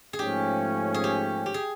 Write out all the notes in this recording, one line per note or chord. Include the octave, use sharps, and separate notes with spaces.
G#4
G#2 F3 A3 C#4 G4
G#4
G4
G4
G#4